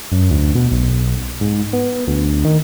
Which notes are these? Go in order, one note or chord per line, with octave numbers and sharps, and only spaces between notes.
F#2
D2
B2
B1
G#2
B3
D2
D#3